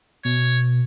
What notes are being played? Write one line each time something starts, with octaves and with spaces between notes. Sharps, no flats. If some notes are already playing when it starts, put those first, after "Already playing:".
B2 C#5